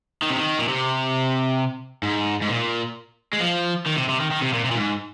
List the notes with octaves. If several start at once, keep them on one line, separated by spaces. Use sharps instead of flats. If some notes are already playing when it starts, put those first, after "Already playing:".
D#3
C3
D#3
A#2
C3
G#2
G#2
A#2
G#3
F3
D#3
C3
C3
D#3
D#3
C3
A#2
C3
A#2
G#2